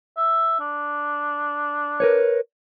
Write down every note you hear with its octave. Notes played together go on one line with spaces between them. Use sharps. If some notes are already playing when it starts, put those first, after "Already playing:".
E5
D4
A#4 B4 C#5